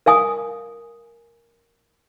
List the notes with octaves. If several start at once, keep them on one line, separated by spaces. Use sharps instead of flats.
A#4 F5 G#5 D#6